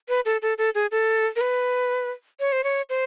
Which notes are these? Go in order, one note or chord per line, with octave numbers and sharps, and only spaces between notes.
B4
A4
A4
A4
G#4
A4
A#4
B4
C#5
C5
C#5
C5